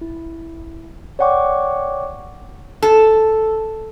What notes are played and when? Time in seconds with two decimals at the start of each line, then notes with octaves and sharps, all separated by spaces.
0.01 E4
1.19 C#5 D5 F#5 G5 C#6 D6
2.82 A4